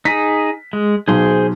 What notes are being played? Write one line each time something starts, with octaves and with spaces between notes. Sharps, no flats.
D#4 G#4 B6
G#3
B1 G#4 C5 C6